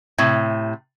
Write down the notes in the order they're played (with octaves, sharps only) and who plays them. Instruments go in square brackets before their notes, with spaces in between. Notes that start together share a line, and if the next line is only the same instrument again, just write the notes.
[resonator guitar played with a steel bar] A2 C3